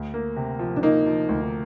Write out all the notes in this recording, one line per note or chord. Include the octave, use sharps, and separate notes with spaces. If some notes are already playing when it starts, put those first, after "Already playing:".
Already playing: D2
A#3
C3
F3
D4
A#3 D#4
F3
D2